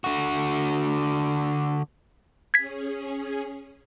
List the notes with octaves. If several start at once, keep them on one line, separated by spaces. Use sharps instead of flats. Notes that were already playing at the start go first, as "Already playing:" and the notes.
D3 F#4
C#4 G#4 G#6 B6